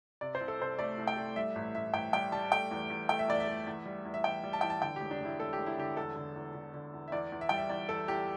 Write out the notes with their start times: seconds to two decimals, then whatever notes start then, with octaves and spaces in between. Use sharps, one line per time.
0.21 C3 D5
0.35 C5
0.41 C2
0.48 A4
0.59 C2 C5
0.78 A3 D5
0.98 C2
1.07 G5
1.17 A3
1.36 G3 E5
1.56 A1
1.75 A1 E5
1.93 A1 G5
2.13 G3 G5
2.32 G3 A5
2.51 A3 G5
2.71 E2
2.90 E2
3.09 A3 G5
3.19 E5
3.28 E2 D5
3.40 E5
3.47 A3
3.66 E2
3.86 G3
4.05 E2
4.14 E5
4.24 E2 G5
4.44 G3
4.53 A5
4.61 E3 G5
4.70 A5
4.82 D3 G5
4.96 E1 G4
5.11 D4
5.20 E1
5.25 E4
5.39 E1 A4
5.53 G4
5.58 E1
5.66 E4
5.78 D3 G4
5.97 E2 A4
6.16 D3
6.36 E2
6.54 D3
6.74 D3
6.94 E2
7.08 E5
7.12 E2 D5
7.32 E2
7.41 E5
7.49 G3 G5
7.58 E5
7.70 E2 D5
7.89 E2 A4
8.08 E2 G4